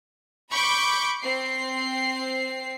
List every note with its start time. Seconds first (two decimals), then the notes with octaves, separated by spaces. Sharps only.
0.51 B5 C#6 D6 G6
1.21 C4 C7